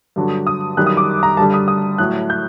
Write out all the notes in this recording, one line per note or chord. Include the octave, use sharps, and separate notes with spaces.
G2 D3 F#3
D#6
F#2 D#3 G3 F#6
D#6
D6
A#5
G2 D3 G3 A5
D#6
D#6
A2 F#3 F#6
G6